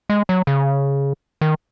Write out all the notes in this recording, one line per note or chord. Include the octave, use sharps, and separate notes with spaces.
G#3
F#3
C#3
D#3